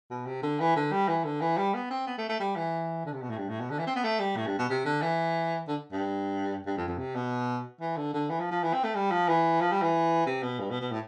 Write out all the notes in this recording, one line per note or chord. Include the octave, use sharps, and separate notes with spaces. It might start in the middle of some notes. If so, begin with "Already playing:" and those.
B2
C3
D3
E3
D3
G3
E3
D3
E3
G3
B3
C4
B3
A3
A3
G3
E3
D3
C3
B2
A2
G2
A2
B2
D3
E3
C4
B3
A3
G3
A2
G2
B2
C3
D3
E3
D3
G2
G2
F2
F2
C3
B2
E3
D3
D3
E3
F3
F3
E3
C4
A3
G3
F3
E3
F3
G3
E3
C3
B2
G2
B2
B2
A2